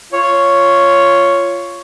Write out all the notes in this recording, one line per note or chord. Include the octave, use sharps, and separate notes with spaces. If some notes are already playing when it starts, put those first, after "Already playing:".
F4 C#5